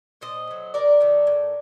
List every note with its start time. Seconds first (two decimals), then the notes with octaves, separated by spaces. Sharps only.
0.21 A#2 C5 D#5
0.47 F#3 A3
0.74 C3 A#4 D5
1.00 D#3 A3
1.27 A2